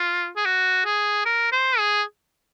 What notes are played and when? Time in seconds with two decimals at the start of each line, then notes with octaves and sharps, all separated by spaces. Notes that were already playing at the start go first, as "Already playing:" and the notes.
Already playing: F4
0.36 G#4
0.45 F#4
0.85 G#4
1.25 A#4
1.52 C5
1.78 G#4